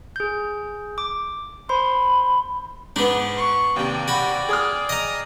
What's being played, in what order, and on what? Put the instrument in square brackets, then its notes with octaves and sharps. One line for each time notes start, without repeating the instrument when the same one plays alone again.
[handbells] G#4 G6
D6
[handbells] C5 C6 [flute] B5
[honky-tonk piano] G#2 [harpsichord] B3 D4
[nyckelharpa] C#6
[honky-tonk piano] D#2 C3 [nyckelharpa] D5 G5
[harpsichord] F#4 B5
[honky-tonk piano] G#4 D#6 F6
[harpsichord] D#5 A#5